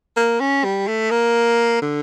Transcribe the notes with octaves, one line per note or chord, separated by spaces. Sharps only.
A#3
C#4
G3
A3
A#3
D3